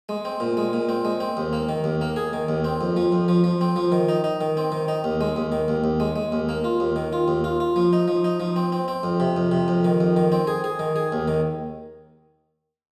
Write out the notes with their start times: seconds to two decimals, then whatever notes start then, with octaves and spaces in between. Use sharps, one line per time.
0.09 G#3
0.25 C4
0.40 A#2
0.57 G#3
0.73 A#2
0.89 C4
1.05 G#3
1.20 C4
1.37 D#2
1.53 A#3
1.69 D#3
1.84 D#2
2.01 A#3
2.16 G#4
2.33 D#3
2.48 D#2
2.64 C4
2.81 F2
2.97 F3
3.12 F2
3.28 F3
3.44 F3
3.61 C4
3.76 F3
3.92 D#3
4.09 D#4
4.24 D#4
4.41 D#3
4.57 C4
4.72 D#3
4.88 D#4
5.04 D#2
5.21 G#3
5.36 D#2
5.52 D#3
5.68 D#2
5.84 D#2
6.00 G#3
6.16 G#3
6.32 D#2
6.49 A#3
6.64 F4
6.80 D#2
6.96 D#3
7.13 F4
7.28 D#2
7.44 F4
7.60 F4
7.76 F3
7.93 D#4
8.08 F3
8.24 D#4
8.40 F3
8.56 C4
8.72 C4
8.88 C4
9.03 F2
9.20 C3
9.37 F2
9.52 C3
9.68 F2
9.84 D#3
10.00 F2
10.16 D#3
10.32 C4
10.47 G#4
10.64 G#4
10.79 D#3
10.96 G#4
11.12 D#2
11.28 D#3